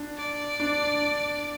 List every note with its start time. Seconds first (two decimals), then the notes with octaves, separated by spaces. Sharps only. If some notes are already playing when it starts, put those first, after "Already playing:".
Already playing: D4
0.18 D5
0.60 D4